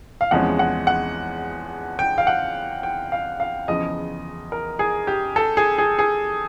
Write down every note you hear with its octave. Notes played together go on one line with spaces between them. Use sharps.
F5
E2 C3 F3 G#3 C#4 F#5
F#5
F#5
G5
F5
F#5
G5
F5
F5
E2 C#3 F3 D#5
A#4
G#4
G4
A4
G#4
G#4
G#4